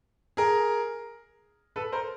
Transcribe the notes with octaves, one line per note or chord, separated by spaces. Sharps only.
G#4 A#4
A4 B4
A#4 C5